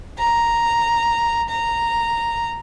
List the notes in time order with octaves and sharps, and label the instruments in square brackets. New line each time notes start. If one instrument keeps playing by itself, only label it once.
[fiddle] A#5
A#5